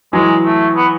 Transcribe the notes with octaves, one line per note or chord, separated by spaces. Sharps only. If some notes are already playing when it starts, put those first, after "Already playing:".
E3 F#3 G#3
A3
B3